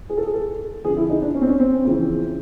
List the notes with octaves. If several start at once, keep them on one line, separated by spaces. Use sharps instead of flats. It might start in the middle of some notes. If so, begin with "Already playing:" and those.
G#4
A4
G#4
A4
F2 D3 G#4
E4
D#4
D4
C#4
C4
C#4
C4
F2 C#3 E3